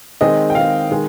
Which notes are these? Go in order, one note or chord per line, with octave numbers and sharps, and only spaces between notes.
D#3 G#3 C4 D#5
G5
D#3 G#3 C4 F5
D#3 G#3